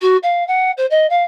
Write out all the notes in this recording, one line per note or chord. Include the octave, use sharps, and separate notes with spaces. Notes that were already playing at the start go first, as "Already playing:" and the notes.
F#4
F5
F#5
C5
D#5
F5